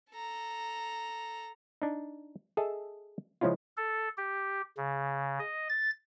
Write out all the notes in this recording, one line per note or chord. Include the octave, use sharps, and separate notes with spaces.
A4 A#5
D4 D#4
G#4 A4 D#5 E5 A5
C#3 F3 G#3 C#4 E4 F4
A4
G4
C#3
D#5
A6